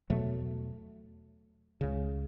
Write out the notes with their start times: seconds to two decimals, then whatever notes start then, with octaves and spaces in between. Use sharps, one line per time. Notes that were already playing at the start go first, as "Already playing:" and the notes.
0.10 E2 B2 F#3 A3
1.81 C#2 C#3